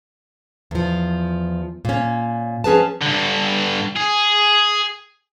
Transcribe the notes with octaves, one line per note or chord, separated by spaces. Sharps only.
E2 F3
A#2 C#4
F3 C#4 G#4 B4 A5
G2 D3
G#4